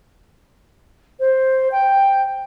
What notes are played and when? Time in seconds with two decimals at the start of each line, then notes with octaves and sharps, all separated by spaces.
1.20 C5
1.72 G5